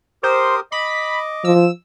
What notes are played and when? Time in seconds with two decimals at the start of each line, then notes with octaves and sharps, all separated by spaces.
0.23 G4 A#4 C5 D#6
0.72 D#5 B5 D6
1.44 F3 E6